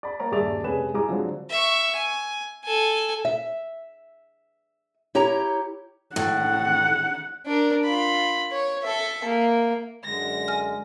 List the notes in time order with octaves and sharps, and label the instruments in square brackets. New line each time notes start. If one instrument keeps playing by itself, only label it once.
[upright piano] D5 B5
A#3 A#4 C#5 D5 A#5
D#1 G2 G#4 D5 E5 F7
F1 G#3 C#4 B4 G#5 E7
G#2 G3 E4 G#5 A#5 D6
D3 F3 F#3 G#3 C4
[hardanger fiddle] E5 C#6
G#5
A4 G#5
[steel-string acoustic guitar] E5
E4 G4 C#5 A#5
[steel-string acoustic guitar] A2 [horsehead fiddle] F#5
[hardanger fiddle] D4 A#4
F4 B5
C#5
A4 E5
A#3
[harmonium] F#2 D3 G#3 [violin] A#6
[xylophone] G#5 F6